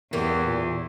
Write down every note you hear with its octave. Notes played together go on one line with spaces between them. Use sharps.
E2 E3 A#3 G4
A#2